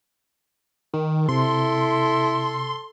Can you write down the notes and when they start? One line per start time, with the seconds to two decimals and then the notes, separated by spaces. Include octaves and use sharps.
0.94 D#3
1.29 C3 E4 A4 C6